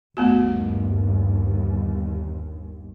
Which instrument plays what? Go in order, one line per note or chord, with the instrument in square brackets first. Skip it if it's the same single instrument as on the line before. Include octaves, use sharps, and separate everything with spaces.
[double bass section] G1 D#2 [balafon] A3 B3 F#4